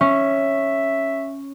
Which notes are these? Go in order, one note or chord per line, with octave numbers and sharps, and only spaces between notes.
C#4 E5